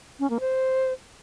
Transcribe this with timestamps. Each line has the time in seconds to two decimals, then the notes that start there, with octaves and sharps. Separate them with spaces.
0.20 C#4
0.30 A#3
0.40 C5